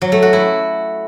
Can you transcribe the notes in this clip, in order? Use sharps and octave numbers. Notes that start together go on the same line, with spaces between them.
F#3
A3
F#4
E4